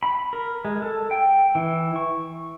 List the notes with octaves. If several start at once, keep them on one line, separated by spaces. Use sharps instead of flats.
B5
A#4
G#3
A4
G5
E3
C#6